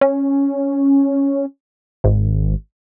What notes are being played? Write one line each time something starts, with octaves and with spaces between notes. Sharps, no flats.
C#4
G#1